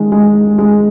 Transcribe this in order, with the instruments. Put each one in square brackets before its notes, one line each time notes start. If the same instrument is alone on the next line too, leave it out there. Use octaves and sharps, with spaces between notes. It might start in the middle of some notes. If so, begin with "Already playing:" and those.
Already playing: [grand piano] D#3 G#3
G#3
G#3